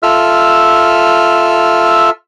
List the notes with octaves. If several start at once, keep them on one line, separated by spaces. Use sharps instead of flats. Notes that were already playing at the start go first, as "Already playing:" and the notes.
F4 A4 E5 E6 F6